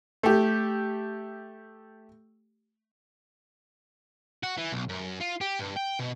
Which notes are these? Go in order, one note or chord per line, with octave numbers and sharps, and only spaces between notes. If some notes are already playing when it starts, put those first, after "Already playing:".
A3 G4
F#4
E3
B1
F#2
F4
G4
G2
G5
B2